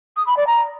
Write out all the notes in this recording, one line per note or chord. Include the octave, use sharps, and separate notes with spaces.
D#6
B5
D5
A#5